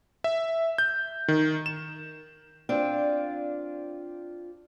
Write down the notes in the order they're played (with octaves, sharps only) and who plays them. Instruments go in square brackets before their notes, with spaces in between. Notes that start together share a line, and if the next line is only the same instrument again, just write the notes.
[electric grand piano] E5
G6
D#3
E7
[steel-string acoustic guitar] C4 D4 F4 D5